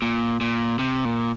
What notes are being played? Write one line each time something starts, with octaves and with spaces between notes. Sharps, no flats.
A#2
A#2
C3
A#2